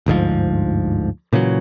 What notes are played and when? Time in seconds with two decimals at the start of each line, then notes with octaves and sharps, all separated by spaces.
0.06 G1 D2 G#2 F3
1.33 A#2 C#3 E3 F#3